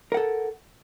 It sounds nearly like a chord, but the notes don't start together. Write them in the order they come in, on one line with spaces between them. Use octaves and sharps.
A#4 F#5 A4